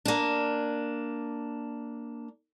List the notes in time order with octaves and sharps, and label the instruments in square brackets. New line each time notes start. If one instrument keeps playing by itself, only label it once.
[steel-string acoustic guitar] A#3 D4